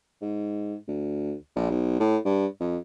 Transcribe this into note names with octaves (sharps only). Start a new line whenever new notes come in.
G#2
D2
A#1
B1
A2
G2
F2